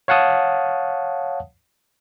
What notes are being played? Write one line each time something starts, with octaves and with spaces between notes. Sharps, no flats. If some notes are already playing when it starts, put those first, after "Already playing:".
C#5 F5 F#5 A5 D#6